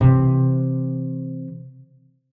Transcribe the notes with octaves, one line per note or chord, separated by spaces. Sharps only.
C3 E3